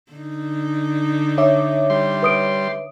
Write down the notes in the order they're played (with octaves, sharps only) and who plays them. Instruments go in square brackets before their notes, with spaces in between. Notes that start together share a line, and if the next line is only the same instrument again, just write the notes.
[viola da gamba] D3 D#4
[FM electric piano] C#5 E5 D6
[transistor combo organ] G3 C6
[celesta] B4 D#6 D7